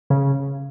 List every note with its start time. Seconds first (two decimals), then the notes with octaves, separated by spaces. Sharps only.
0.10 C#3